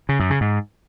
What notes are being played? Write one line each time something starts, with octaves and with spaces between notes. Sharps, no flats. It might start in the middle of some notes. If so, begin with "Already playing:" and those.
C#3
F#2
C#3
G#2